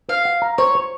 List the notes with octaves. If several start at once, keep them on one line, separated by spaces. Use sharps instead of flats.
C5 F5
F#5
A#5
C5 C#5
C5